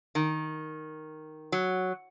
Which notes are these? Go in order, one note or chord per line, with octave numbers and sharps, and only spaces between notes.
D#3
F#3